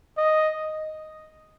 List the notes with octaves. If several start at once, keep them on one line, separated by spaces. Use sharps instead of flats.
D#5